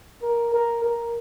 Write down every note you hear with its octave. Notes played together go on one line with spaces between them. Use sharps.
A#4
A#4
A#4